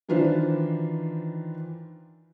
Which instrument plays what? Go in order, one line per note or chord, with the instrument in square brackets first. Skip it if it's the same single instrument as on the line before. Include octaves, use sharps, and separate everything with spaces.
[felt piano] D#3 E3 D4 F4 B4 C5